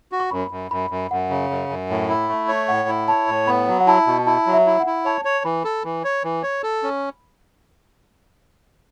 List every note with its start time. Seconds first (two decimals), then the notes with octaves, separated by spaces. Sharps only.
0.12 F#4
0.20 C#6
0.31 F#2 B5
0.51 F#2
0.71 F#2 B5
0.90 F#2
1.11 F#2 F#5
1.30 C#3
1.50 F#2
1.69 F#2
1.90 A2
2.09 E4
2.29 A3
2.48 C#5
2.68 A2 F#5
2.88 E4
3.08 C#5 A5
3.28 A2
3.47 B3 B5
3.68 F#3
3.80 F#5
3.87 E4 A5
4.07 B2
4.27 E4 A5
4.46 F#3
4.53 E5
4.66 E4
4.80 F#5
4.86 E4
5.05 C#5 A5
5.25 C#5
5.45 E3 B5
5.65 A4
5.84 E3
6.04 C#5
6.24 E3
6.43 C#5
6.63 A4
6.83 C#4